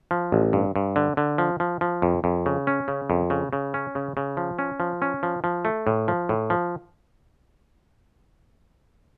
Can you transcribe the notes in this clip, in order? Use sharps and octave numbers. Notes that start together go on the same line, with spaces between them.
F3
A1
G2
G2
D3
D3
F3
F3
F3
F2
F2
C#3
C#4
C#3
F2
C#3
C#3
C#4
C#3
C#3
F3
C#4
F3
C#4
F3
F3
A3
A2
F3
A2
F3